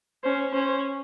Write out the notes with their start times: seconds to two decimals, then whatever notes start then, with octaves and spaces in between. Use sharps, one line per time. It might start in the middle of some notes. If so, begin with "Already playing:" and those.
0.23 C#4 C5
0.53 C#4 C5